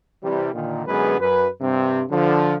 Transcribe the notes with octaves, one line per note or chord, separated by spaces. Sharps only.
C3 E3 G3
A#2 D3 D#3
F#2 D3 G#3 B3 G#4 B4
F#2 B4
G2 C3 C4
D3 F3